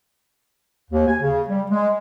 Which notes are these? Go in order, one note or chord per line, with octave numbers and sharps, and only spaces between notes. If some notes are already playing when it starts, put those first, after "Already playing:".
D#2
G#5
C#3
G3
G#3